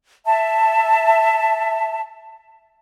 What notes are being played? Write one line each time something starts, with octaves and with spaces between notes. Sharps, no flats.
E5 A5